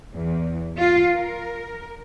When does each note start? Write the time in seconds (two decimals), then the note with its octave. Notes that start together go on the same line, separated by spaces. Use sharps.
0.12 E2
0.78 F4
1.12 A#4